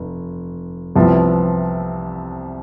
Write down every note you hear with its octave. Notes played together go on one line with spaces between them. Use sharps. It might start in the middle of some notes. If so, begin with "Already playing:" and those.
Already playing: F1
C2 C3 F3 B3